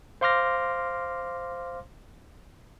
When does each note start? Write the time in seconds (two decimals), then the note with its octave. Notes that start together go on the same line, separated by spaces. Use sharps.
0.21 C5 F5 C6 D6 F6 A#6